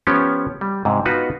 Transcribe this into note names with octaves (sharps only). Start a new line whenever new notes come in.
F3 B3 C#4 G4 C#5
G3
G#2 C3
B3 D#4 F4 F#4 B4